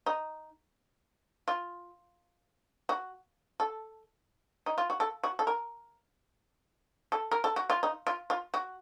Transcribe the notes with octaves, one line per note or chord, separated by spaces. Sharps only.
D#4
F4
F#4
A4
D#4
F4
F#4
A4
F#4
A4
A#4
A4
A#4
A4
F#4
F4
D#4
F4
F4
F#4